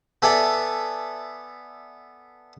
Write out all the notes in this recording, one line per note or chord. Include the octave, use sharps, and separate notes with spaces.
B3 A4 D5 E5 G#5 A5